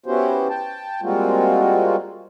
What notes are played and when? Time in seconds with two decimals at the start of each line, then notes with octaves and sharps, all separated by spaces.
0.06 B3 C#4 E4 F#4 G4 C5
0.49 G5 A5
1.02 G3 G#3 A#3 C4 F4 F#4